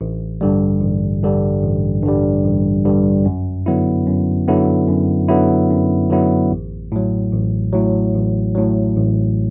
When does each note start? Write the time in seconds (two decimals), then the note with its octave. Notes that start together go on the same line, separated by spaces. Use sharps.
0.01 A1
0.41 G2 D3 G3
0.82 A1
1.23 G2 D3 G3
1.63 A1
2.03 G2 D3 G3
2.45 A1
2.85 G2 D3 G3
3.25 F#2
3.66 D3 F#3 B3 E4
4.06 F#2
4.48 D3 F#3 B3 E4
4.88 F#2
5.28 D3 F#3 B3 E4
5.70 F#2
6.10 D3 F#3 B3 E4
6.51 A1
6.92 A2 F#3
7.33 A1
7.73 A2 F#3
8.14 A1
8.55 A2 F#3
8.96 A1